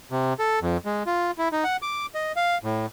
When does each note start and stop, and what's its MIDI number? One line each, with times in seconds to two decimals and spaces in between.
0.12 0.34 48
0.39 0.59 69
0.62 0.77 41
0.85 1.03 56
1.06 1.31 65
1.38 1.49 64
1.52 1.64 63
1.64 1.77 78
1.82 2.06 86
2.15 2.32 75
2.36 2.58 77
2.64 2.86 45